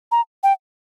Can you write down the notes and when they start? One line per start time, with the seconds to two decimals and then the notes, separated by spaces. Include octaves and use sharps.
0.12 A#5
0.43 G5